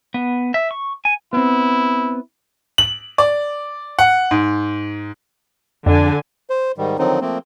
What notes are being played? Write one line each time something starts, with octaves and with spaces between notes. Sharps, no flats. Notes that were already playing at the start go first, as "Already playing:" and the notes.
B3
E5
C#6
G#5
B3 C4 E4
F#7
D5
F#5
G#2
F2 D3 D4 G#5
C5
G#2 D#3 G3
D3 D#3 F3 F#3 C4 D#4
F3 A3 A#3 C4